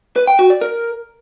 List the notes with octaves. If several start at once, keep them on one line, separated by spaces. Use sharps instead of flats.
B4
G5
F#4
D5
A#4